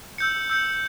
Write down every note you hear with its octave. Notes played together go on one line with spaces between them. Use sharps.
E6 G6 C#7
E6 G6 C#7